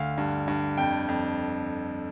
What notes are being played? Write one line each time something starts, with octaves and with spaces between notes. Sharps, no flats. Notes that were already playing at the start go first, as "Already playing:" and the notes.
Already playing: D2 F5
G2
G2
F2 G5
F2